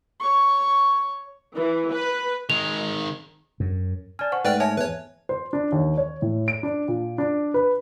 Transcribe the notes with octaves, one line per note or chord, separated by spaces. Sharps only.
C#5 C#6
E3
B4
D#3 G#3 F7
F#2
D5 G#5 A5 F6
C5 F#5 C#6
G#2 A3 B4 D5 F#5 G5 F6
C#5 E5 G#5 A5
E2 B4 C#5
C5
D4
D#2
C#5
A2
D7
D4
A#2
D4
B4